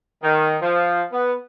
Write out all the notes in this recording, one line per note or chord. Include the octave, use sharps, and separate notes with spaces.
D#3
F3
B3